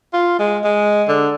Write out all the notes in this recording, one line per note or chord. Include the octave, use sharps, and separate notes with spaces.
F4
G#3
G#3
D3